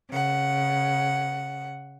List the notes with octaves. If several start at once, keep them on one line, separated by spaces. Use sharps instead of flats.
C#3 F#5